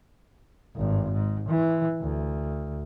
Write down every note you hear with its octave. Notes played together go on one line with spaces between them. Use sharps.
G#1 G2
G#2
E3
D2